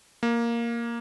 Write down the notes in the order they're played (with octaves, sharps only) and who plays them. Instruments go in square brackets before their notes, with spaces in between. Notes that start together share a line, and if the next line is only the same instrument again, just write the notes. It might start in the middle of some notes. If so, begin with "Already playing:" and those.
[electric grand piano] A#3